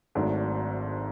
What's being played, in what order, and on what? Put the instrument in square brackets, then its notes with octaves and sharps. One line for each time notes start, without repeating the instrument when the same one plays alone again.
[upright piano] G#1 G#2 F#3 A3 D4